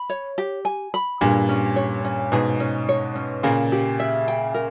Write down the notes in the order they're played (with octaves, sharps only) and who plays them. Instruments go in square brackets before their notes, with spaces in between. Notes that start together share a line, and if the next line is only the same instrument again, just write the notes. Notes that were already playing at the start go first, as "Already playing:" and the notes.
Already playing: [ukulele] B5
C#5
G4
G#5
B5
[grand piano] G2 A#2 [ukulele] G#4
[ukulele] C#4
C#5
C#4
[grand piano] G#2 B2 [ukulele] G#4
[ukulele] C#4
C#5
C#4
[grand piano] A#2 C#3 [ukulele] A#4
[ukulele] G4
E5
G5
A#4